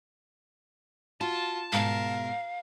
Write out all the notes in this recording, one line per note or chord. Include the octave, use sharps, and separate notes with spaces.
F4 F#4 A5
G#2 B2 A#4 F5